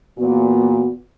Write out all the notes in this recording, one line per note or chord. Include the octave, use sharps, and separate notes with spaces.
E2 A#2 B3 F#4